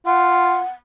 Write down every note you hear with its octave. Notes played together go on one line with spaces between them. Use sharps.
F4 F#5